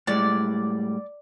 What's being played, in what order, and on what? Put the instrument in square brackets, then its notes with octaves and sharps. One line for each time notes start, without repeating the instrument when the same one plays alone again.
[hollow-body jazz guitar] A2 G3 G#3 [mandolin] D5